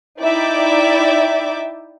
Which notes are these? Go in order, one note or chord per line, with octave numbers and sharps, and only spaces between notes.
D#4 E4 D5 E5 G5 D6